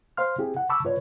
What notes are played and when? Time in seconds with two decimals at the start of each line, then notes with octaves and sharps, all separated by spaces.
0.17 C5 F5 C6 F6
0.38 C4 E4 G4 G#4
0.57 F#5
0.69 A5 B5 C#6 D6 E6
0.84 G2 F4 B4 C#5 D5